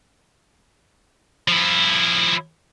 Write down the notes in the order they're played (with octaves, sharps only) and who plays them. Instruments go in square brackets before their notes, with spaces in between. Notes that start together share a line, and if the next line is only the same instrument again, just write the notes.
[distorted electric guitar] F3 E4